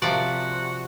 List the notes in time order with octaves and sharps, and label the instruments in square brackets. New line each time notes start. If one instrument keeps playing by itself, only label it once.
[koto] C3 F3 D5 [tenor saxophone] F#4